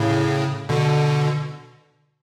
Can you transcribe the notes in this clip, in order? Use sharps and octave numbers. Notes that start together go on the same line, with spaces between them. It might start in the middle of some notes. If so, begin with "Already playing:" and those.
Already playing: A2 C#3
B2 D3